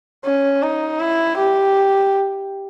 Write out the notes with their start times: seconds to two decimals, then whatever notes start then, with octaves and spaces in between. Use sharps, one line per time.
0.25 C#4
0.62 D#4
1.00 E4
1.37 G4